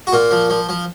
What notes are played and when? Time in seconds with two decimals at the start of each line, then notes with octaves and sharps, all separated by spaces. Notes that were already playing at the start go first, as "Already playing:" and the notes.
0.07 F#4
0.13 A#2 F4
0.31 F3
0.50 F3
0.69 F3